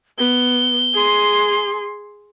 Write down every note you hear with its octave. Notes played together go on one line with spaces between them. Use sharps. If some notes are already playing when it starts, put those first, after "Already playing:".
B3 G7
G#4 C6